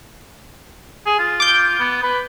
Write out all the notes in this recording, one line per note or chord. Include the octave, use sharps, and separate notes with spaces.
G#4
F4
D6 G6
B3
B4